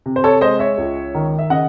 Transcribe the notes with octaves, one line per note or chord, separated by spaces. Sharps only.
C3
C5
A4 C#5
G#3 C5 D#5
C#5 E5
C#2
D#3
E5
C#3 D#5 F#5